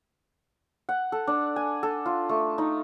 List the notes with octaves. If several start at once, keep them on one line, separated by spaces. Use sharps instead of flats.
F#5
A4
D4
G#5
A4
F4
A3
D#4